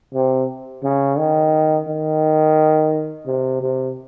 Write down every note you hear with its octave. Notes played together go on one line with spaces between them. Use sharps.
C3
C#3
D#3
D#3
C3
C3